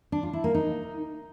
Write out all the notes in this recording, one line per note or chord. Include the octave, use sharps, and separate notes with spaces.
D4
F4
E4
A#3
D#4